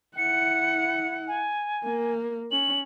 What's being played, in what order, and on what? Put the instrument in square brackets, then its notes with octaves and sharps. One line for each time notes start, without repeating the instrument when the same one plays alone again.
[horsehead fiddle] E4 F#5 [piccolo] C#7
[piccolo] G#5
[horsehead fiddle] A#3
[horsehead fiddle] C#4 [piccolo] F#7